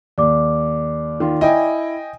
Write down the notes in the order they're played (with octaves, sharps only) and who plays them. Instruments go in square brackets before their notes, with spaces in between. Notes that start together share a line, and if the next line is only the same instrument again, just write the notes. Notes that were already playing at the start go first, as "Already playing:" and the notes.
[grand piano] D#2 [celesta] D5 D6
[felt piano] D#3 F4
[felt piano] E4 [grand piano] D#5 G5 G#5